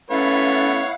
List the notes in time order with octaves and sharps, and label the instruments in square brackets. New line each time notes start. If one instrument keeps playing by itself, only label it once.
[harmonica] A3 B3 B4 [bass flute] C#4 [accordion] E4 F5 F#5 [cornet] C#5